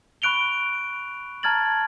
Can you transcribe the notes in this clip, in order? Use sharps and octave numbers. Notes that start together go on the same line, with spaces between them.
B5 C#6 F#6 D7 F7 G7
A5 A#5 F6 G#6 A6 F#7